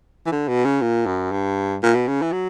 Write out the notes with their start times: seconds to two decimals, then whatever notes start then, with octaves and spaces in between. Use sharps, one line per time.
0.26 E3
0.32 D3
0.48 B2
0.65 C#3
0.81 A#2
1.06 F#2
1.32 G2
1.83 A#2
1.95 B2
2.07 C#3
2.22 E3
2.32 F#3